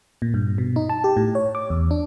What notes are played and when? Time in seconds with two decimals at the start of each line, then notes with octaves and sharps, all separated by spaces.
0.22 A#2
0.34 G2
0.58 B2
0.76 D#4
0.89 A5
1.04 G4
1.17 A2
1.35 C#5
1.55 D6
1.70 E2
1.91 D4